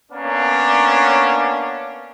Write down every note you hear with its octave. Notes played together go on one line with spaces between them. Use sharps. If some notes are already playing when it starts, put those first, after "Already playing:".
A#3 B3 C#4 D4